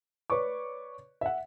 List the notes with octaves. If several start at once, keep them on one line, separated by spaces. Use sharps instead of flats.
B4 C#5 D5 C#6 D6
E5 F#5